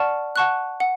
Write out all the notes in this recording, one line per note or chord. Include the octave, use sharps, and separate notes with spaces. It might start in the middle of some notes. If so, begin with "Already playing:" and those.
Already playing: D5 F#5 A5 C#6 F6
F#5 A5 C#6 F#6
F#5